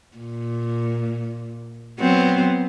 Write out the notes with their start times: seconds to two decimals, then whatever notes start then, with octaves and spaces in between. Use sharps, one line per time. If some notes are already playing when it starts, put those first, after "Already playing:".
0.17 A#2
1.99 F#3 B3 C4